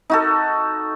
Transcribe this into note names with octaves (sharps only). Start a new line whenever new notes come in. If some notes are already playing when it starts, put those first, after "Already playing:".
D#4 F#4 A4